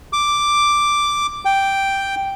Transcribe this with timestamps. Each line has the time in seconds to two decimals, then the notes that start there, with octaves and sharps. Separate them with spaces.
0.13 D6
1.45 G5